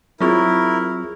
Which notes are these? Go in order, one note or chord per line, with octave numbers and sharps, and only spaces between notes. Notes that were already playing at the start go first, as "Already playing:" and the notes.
F#3 C4 E4 F4 G#4 A#4 C#6